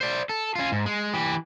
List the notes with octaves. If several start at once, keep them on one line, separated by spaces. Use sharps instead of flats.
C5 D5
A4
C#4 F4
G#2
G#3
E3 G4